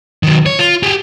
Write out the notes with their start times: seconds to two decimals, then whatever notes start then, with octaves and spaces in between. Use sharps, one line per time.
0.23 D#3 F#3
0.46 C#5
0.59 F4
0.83 G4 G#4